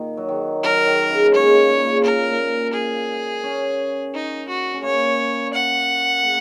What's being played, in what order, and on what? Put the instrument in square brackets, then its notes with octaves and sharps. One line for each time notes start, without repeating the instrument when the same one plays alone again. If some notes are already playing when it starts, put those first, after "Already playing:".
Already playing: [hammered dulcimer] A#2 D#3
F#3
D#3
[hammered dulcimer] F#3 [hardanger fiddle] A#4
[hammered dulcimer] D#3
C#3
A#3
[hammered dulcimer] G#3 [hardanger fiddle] C#5
[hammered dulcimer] A#3
A#2
C#3
[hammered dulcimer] A#2 [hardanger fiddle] A#4
[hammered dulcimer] A#2
[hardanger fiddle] G#4
[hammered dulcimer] C#4
[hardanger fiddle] D#4
F#4
[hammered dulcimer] C#4
[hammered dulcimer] A#3 [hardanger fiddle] C#5
[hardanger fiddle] F#5
[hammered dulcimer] A#3